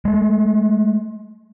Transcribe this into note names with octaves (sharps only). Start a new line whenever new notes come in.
G#3 A3